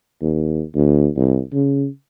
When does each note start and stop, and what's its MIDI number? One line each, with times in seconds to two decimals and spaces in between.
0.21 0.62 39
0.75 1.08 38
1.16 1.40 36
1.53 1.86 49